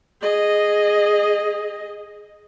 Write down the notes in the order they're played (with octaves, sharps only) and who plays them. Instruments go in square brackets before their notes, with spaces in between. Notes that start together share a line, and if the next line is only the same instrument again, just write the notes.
[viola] G#4 D#5